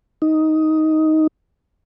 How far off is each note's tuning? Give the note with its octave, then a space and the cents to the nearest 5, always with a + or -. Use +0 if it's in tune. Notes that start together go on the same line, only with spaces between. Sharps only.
D#4 +10